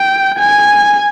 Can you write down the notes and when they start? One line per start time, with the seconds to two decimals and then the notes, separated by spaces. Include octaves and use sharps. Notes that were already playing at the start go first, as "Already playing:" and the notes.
Already playing: G5
0.39 G#5